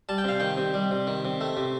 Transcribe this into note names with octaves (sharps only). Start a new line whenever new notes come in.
G3 A5
G5
C3 F5
D#3 G5
C3
G3
C3
D#3
C3
A3
C3